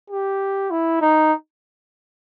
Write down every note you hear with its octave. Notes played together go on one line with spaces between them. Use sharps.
G4
E4
D#4